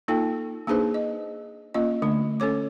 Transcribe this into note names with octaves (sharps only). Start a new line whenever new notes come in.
A#3 D#4 F4 A4 G5
A#3 D4 D#4 G#4 B4 C5
D#5
A#3 C#4 F4 D#5
D3 A3 D4
C#4 A4 C#5 D6